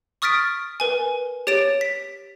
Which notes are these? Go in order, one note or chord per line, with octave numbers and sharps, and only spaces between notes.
C#6 D#6 F6 A6 B6 D7
A#4 B4 G#5
G4 C#5 A6 D7 E7
B6